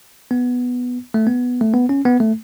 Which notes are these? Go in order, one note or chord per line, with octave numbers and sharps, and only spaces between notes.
B3
A3
B3
A3
B3
C#4
B3
A3